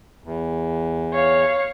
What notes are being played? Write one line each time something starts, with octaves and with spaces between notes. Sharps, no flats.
E2
C#5 F5